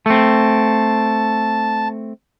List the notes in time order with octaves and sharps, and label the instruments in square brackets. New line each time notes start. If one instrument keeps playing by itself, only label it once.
[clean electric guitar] A3 C4 [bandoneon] A5